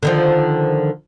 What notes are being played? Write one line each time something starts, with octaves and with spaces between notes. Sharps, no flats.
D3 D#3 F3